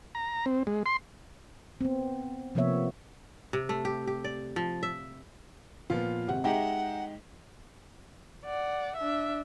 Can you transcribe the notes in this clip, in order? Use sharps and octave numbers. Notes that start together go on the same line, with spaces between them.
A#5
C4
G#3
C6
B3 C4
C3 F3 A#3 B3 C#5 E5
C3
A3
G4
G4
D5
F3
E5
A#2 F3 B3 F4
G#1 C3 F#5
G#3 D#4 G4 E5 F#5 G5 A#5
D5 F#5
D4 E5